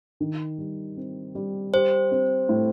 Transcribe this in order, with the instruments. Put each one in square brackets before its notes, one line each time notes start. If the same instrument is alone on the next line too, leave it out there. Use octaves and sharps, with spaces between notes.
[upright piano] D#3
G3
C4
G3
[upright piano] G4 [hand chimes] C5
[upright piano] C4
A2